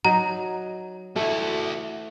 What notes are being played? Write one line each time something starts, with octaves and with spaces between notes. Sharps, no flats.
F#3 D#4 A#5
A3 E4 F#4 A4